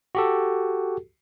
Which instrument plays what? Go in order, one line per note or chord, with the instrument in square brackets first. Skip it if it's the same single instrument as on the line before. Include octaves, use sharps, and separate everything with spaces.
[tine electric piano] F#4 G4 A4